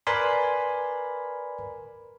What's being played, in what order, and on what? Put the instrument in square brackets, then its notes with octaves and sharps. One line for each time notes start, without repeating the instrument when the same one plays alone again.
[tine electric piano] A#4 B4 D5 G#5 B5 C6